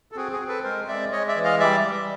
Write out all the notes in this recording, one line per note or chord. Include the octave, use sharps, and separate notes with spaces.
A4
C4 F#4 G#4
F#4 G#4
C4
A4 B4
G#3 A#4 C5
G#3 D5 E5
G#3 C#5 D#5
D5 E5
E3
D#5 F5
G3 D5 E5
G3